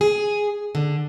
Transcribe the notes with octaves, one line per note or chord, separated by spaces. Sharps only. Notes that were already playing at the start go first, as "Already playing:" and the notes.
G#4
D3